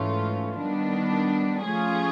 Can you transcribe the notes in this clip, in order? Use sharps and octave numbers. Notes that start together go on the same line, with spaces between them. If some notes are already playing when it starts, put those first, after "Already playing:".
Already playing: G#2 E3 A3 C#4 F4
D#3 G3 B3 D4
F3 A3 C#4 F4 G#4